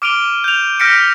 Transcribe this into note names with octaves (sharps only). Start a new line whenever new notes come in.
D6 F6 D7 D#7 F7 G7
G6 F7
F6 G6 A#6 B6 C#7 D7